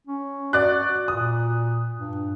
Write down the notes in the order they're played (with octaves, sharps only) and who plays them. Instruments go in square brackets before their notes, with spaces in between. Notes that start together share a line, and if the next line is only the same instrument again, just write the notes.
[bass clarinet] C#4
[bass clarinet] F#4 [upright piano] D5 F#6
[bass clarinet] A#2 [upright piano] D#6
[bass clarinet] G2